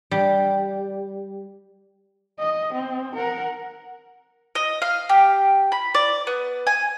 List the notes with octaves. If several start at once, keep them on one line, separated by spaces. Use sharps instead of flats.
G3
D#5
C4
A#4 F#5
D#5
F5
G4
B5
D5
B3
G#5